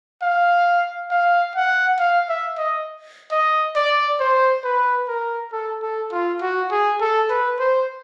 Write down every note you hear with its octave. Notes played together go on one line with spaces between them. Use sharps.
F5
F5
F#5
F5
E5
D#5
D#5
D5
C5
B4
A#4
A4
A4
F4
F#4
G#4
A4
B4
C5